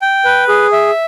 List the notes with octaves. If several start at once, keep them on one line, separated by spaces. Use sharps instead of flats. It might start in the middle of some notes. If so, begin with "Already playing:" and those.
G5
B4
G#4
E5